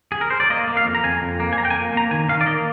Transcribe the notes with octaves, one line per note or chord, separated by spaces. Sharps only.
G#4
A#4
C5
D5
A#3 D#5
A#3
F5
F2
A#5
F2 G#5
F2
A#3
G#5
F2 A#5
G5
G#5
A#3
A#3 A#5
D#3 G#5
D#3 F5
D5
A#3 D#5